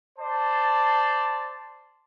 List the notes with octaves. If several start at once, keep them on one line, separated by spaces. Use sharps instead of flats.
C5 D5 A5